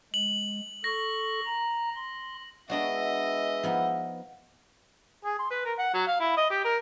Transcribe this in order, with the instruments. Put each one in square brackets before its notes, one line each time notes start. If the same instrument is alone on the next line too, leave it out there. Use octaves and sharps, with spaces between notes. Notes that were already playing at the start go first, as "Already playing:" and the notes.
[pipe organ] G#3 [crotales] F#7
[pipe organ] A4 C#6 [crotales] A#6
[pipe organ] A#5
C6
[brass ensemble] G#3 B4 E5 [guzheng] B3 D4 F#4 [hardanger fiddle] D#5
[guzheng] F3 B3 D#4
[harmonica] G#4
C6
B4
A#4
F#5
F#3
F5
E4
D#5
G4
A#4